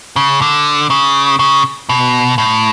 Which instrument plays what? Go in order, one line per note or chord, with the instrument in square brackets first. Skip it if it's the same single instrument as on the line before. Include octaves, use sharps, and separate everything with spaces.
[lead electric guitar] C#3
D3
C#3
C#3
B2
A2